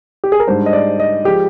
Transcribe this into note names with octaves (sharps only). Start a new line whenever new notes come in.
G4
G#4
A#4
G#2 G3 D4 C5
D#5
D5
D#5
F3 G#3 G4